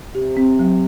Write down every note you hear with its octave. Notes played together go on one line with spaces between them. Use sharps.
C3 G4
C4
F#3